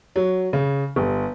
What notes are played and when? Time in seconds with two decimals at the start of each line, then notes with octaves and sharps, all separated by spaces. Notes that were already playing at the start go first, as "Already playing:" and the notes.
0.16 F#3
0.53 C#3
0.96 G1